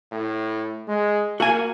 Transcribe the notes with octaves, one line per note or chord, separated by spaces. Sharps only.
A2
G#3
A#3 F#4 G#5